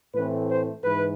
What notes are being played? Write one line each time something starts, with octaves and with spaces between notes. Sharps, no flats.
A2 E3 A3 C4 B4
C5
G#2 E3 B4